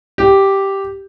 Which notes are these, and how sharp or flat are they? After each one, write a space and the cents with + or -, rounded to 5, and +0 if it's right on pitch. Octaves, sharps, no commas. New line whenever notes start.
G4 -5